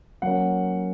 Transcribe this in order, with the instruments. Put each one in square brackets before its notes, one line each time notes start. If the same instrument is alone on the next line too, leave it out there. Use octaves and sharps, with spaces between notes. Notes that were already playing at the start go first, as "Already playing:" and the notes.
[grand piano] F#3 A#3 C#4 F#5